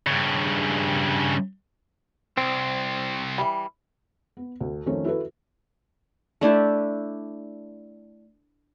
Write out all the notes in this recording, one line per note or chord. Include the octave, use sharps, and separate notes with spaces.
G2 C#3
C2 C4
E3 G3
B3
D2
F2 D#3 F3 A3 C#4
E4 F#4 A4 B4
A3 D4 E4 G4